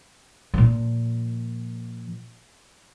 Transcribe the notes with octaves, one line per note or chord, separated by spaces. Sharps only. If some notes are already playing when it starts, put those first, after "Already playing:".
A#2 F3